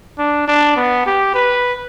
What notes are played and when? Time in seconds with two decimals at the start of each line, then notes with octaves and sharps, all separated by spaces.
0.19 D4
0.48 D4
0.76 B3
1.06 G4
1.34 B4